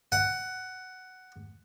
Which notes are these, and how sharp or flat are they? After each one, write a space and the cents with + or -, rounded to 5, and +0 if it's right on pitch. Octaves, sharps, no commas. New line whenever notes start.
F#5 +10